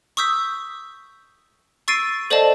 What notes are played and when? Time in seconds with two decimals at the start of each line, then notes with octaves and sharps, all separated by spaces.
0.17 C#6 D#6 E6 G6 B6
1.88 C#6 E6 A6 C7 D7 D#7
2.30 A4 C5 D5 D#5 F5 A5